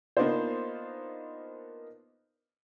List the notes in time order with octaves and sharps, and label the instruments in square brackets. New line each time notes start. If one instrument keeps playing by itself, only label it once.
[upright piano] A#3 B3 D4 D#4 F4 C5